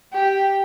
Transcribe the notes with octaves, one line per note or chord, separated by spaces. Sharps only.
G4